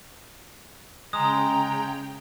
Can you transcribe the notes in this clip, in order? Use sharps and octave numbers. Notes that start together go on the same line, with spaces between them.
C#3 G#3 G5 A#5 D#6